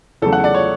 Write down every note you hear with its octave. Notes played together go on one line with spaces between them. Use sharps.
E2 C#3 F#3 A3 A4
F#5
D5
C#5